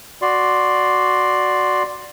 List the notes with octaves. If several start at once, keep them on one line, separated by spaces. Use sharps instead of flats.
F#4 D5 C6